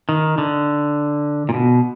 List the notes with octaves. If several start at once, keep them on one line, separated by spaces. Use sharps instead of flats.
D#3
D3
A#2
B2